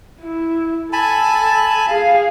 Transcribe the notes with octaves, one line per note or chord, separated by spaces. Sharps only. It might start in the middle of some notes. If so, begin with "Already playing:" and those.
E4
A4 G#5 A5 B5
G#4 F5